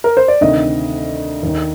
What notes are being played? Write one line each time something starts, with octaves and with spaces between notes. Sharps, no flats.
A#4
C5
D5
D2 C3 D#3 D#5
D#2 D#3